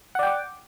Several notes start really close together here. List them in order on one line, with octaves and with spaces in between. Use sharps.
F#5 D5 G5 D6